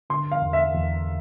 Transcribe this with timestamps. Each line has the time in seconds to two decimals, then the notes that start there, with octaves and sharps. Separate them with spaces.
0.10 D3 C6
0.32 F5
0.42 E2
0.53 E5
0.74 E2